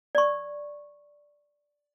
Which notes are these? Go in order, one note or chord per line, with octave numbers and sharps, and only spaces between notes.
D5 C#6